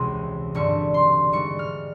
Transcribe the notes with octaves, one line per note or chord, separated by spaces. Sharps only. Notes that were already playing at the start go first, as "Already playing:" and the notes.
Already playing: E1 C#2 C3 E3 G#3 C4
G1 G2 D3 G3 C4 C#6
C6
G#2 E3 G3 C#6
F6